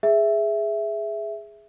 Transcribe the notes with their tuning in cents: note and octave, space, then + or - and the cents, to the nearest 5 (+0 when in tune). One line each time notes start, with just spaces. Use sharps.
G#4 +0 E5 +0